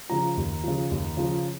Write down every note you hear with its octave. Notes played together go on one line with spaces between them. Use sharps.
C#3 F3 A#5
D#2
C#3 F3
D#2
C#3 F3